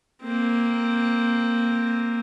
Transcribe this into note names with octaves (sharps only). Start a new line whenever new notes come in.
A#3 C4